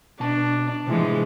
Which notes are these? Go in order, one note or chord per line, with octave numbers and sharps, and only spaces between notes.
B2 D4 A5
A2 C3 E3 F3 G#3